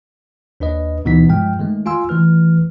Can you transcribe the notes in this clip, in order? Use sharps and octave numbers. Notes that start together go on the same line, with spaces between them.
D#2 D4 B4 D#5
D2 B2 E3 B3 D#4 B6
G2 F3 G#3 G5 F6
D#3 G#3 A3
F4 F5 G#5 C6 E6
D#3 E3 A3 B4 F6